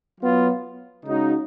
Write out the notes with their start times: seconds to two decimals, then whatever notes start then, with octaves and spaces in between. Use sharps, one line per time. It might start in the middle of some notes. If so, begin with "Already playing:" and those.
0.19 F#3 B3 F4
1.04 C#3 G#3 D#4 F#4